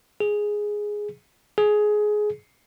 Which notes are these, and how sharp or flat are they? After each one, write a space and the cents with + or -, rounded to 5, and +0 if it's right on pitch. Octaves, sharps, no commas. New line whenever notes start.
G#4 +0
G#4 +15